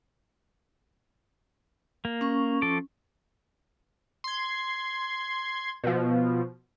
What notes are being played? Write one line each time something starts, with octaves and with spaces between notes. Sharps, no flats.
A#3
C#4 C#6
F3 A4 D6
C6 G#6
B2 F3